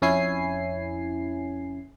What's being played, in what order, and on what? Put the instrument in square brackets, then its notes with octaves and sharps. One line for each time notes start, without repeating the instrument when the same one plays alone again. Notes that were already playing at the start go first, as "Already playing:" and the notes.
[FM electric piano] F2 C#4 E4 G#5 C7